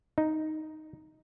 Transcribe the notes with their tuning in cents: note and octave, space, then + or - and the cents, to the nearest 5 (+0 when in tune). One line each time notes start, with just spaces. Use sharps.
D#4 +0